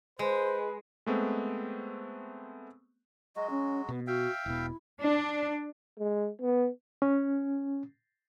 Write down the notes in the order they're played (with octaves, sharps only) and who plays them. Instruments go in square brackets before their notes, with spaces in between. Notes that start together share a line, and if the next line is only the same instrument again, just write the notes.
[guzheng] G#3 [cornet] B4 [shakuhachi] C5
[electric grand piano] G#3 A3 B3 C4
[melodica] F#3 G#3 F#4 [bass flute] D#5
[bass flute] C#4
[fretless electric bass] B2 [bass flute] B3
[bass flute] F#4 [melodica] E5 F5 G5
[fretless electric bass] E1 B2 [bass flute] E4
[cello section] D4
[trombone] G#3
B3
[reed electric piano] C#4